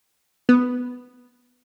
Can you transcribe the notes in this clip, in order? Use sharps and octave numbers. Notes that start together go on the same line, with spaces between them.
B3